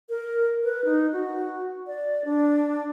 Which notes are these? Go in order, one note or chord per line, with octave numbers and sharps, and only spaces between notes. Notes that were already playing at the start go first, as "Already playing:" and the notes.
A#4
B4
D#4
F#4
D5
D4